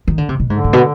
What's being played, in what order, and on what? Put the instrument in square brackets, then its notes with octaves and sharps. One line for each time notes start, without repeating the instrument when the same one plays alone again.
[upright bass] D#3
D3
C3
B2
[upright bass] G#2 [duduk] D3
[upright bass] G#2
B2